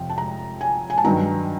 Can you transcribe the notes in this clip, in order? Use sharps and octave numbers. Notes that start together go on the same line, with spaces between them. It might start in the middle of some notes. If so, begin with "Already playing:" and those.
Already playing: F2 C3 F3 G5
A5
A#5
G#5
G#5
A5
G2 D#3 F#3 A#5